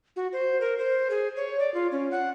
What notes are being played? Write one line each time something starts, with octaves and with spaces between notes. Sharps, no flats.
F#4
C5
A#4
C5
G#4
C#5
D5
F4
C#4
F#5